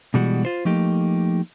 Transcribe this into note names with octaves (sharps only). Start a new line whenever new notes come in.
B2 E3 G3 G#3 F#4
F4 C5
F3 A3 A#3 D#4 G4